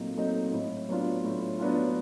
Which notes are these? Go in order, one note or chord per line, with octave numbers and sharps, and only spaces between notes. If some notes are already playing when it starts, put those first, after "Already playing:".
Already playing: A#2 F#3 A3 C4 D#4
F#3 A3 C4 D#4
A2
F#3 B3 D4 F4
A2
F#3 B3 D4 F4